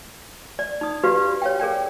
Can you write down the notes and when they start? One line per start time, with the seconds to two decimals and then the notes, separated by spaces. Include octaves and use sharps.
0.59 D5
0.81 D#4 D#6
1.04 F#4 G4 B4 D5 F5
1.42 C#5 F5 G5
1.60 G#4 A#4 D5 G5